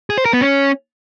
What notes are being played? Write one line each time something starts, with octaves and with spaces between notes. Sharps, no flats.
G#4
C5
A#4
B3
C#4